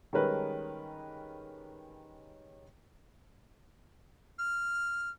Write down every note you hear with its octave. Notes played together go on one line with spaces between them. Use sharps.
D#3 G3 G#3 C#4 A#4 B4
F6